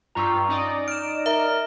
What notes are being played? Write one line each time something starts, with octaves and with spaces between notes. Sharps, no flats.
G2 G3 F4 A#5 C#6 E6
C#4 D#4 D5 D#5 D#6
F6 D7 E7
A#4 E5